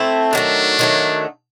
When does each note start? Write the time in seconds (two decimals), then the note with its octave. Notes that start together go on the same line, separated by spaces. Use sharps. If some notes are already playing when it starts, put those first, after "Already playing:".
Already playing: A3 C4 E4 A4
0.32 D#3 F#3 A3 D4
0.79 D#3 F#3 A3